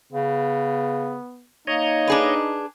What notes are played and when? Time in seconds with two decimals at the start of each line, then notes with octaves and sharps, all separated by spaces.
0.13 C#3 B3
1.67 A#3 D#4 C#5 D#5
2.07 D4 G#4 B4